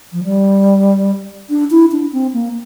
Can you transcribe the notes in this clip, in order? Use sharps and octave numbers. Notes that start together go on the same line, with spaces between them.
F3
G3
D4
E4
D4
C4
A#3